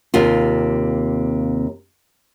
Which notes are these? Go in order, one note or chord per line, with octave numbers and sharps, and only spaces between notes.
D#2 C3 F4